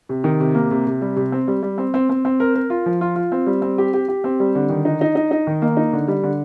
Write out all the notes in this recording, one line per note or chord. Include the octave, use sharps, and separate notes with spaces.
C3
D#3
C3
A#3
C3
C3
G3
C3
C4
G3
G3
C4
C4
C4
C4
A#4
A#4
F4
F3
F4
F4
C4
G3
C4
G4
G4
G4
C4
G3
D3
D#3
D#4
D#4
D#4
D#4
D#3
A#3
D#4
D3
G3
D3